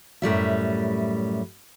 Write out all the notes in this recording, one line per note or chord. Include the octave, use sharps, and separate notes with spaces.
F#2 A2 G3 E5